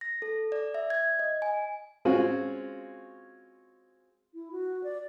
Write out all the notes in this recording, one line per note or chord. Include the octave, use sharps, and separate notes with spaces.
A#6
A4
D5
E5
G#6
D#5
G#5
G#3 C4 C#4 F4 F#4
E4
F#4
D5